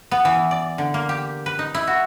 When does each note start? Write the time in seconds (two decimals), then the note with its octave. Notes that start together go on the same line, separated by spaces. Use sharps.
0.11 B3
0.25 E3
0.51 D5
0.78 D3
0.94 A#3
1.09 G4
1.46 B4
1.59 D#4
1.74 E4
1.87 F#4